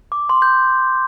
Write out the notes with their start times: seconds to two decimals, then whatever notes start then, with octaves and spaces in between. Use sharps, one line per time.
0.12 D6
0.29 C6
0.42 G6